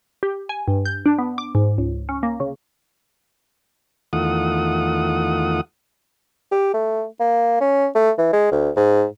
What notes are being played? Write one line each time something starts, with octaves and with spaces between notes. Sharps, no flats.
G4
G#5
G2
G6
D4
B3
D6
G#2
C#2
C#4
A#3
C#3
E2 D#3 A3 F4 F#5 D#6
G4
A3
A#3
C#4
A3
E3
G#3
D2
G#2